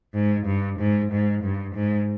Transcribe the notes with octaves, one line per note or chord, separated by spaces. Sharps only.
G#2
G2
G#2
G#2
G2
G#2